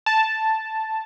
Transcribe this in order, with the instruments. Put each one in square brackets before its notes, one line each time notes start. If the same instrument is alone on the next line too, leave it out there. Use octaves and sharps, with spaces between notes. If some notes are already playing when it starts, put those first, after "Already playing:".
[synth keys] A5